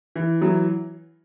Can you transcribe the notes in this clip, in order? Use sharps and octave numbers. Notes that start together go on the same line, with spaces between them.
E3
E3 F#3